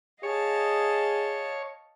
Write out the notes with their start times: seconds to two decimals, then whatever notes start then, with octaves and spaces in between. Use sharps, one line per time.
0.23 G#4 C#5 D#5 F5 A5